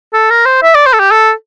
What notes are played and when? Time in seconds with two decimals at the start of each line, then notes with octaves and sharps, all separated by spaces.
0.13 A4
0.30 A#4
0.45 C5
0.63 E5
0.75 D5
0.86 C5
0.93 A4
1.00 G4
1.11 A4